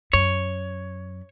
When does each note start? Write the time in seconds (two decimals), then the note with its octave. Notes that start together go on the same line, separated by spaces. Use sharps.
0.13 F#2 C#5